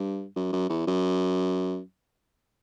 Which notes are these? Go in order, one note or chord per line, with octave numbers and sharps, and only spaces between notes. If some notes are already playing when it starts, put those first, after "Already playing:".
Already playing: G2
F#2
F#2
E2
F#2